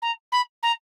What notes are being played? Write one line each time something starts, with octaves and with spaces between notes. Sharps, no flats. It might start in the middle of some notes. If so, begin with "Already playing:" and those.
A#5
B5
A#5